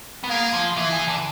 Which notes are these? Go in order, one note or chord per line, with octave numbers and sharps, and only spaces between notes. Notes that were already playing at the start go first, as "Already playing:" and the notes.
B3
A#3 G#4
F3
E3 G#4
E3
D3